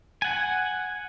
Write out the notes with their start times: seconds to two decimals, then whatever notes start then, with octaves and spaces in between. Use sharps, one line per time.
0.22 F#5 G#5